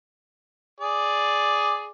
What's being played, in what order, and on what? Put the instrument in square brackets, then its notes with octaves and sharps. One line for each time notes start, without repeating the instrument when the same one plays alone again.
[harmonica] G#4 D5